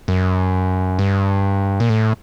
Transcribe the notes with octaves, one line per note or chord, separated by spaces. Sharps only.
F#2
G2
A#2
A2